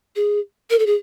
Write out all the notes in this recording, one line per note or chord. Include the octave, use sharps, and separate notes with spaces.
G#4
A#4
A4
G#4